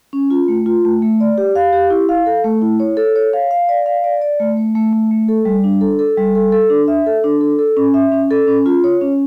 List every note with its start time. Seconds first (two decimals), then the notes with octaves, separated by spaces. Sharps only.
0.13 C#4
0.31 F4
0.48 A3
0.66 F4
0.85 A3
1.02 A3
1.20 D5
1.38 G4
1.56 F5
1.73 G4
1.90 E4
2.09 F5
2.26 A4
2.44 A3
2.62 E4
2.80 C#5
2.97 A4
3.16 C#5
3.33 F5
3.51 F5
3.69 D5
3.86 F5
4.04 D5
4.22 D5
4.40 A3
4.57 A3
4.75 A3
4.93 A3
5.11 A3
5.28 A4
5.45 G3
5.64 D4
5.81 A4
5.99 A4
6.18 G3
6.35 A4
6.52 A4
6.70 D4
6.88 E5
7.06 A4
7.24 D4
7.41 A4
7.59 A4
7.77 C#4
7.94 E5
8.12 C#4
8.31 A4
8.47 C#4
8.66 F4
8.84 C#5
9.01 C#4